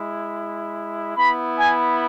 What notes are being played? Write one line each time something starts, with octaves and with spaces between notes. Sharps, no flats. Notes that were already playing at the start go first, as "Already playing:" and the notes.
Already playing: G#3 E4
B3 E4 B5
G#5